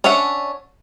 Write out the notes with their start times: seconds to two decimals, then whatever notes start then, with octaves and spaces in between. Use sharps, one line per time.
0.04 C#4 D4 C#5 E5 F#5